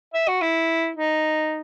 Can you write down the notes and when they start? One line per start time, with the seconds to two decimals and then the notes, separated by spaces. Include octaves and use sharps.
0.14 E5
0.28 F#4
0.41 E4
0.96 D#4